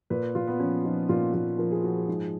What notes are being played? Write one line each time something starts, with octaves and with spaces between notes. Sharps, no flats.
A#2 B4
A#2 F4
B3
F3 C#4
F3 D#4
A#2 F4
A#2 F4
F3 A#4
G#4
F3 F#4
G#4
G#2